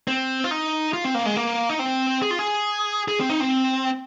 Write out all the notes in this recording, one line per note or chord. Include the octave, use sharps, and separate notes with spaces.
C4
F4
D#4
F4
C4
A#3
G#3
A#3
D#4
C4
G#4
F4
G#4
G#4
C4
D#4
C4